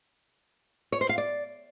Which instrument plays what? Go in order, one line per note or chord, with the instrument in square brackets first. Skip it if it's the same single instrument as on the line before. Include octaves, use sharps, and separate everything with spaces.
[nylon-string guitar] C#5
C5
F5
D5